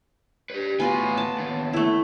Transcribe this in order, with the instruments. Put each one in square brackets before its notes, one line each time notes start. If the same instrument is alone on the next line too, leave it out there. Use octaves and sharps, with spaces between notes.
[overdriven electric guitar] G4 B4
[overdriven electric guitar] A2 G#5 [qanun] B3 F4 F#4
[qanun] A5
[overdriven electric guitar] D#2 B3
[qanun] A3 E4